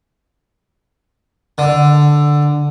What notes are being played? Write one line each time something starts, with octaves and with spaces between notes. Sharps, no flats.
D3